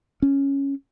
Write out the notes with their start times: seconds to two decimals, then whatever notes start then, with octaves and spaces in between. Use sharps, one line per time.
0.22 C#4